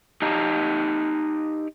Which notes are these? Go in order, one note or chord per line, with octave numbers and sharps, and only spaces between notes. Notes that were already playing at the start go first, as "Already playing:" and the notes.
D#4 G4 A5 A#5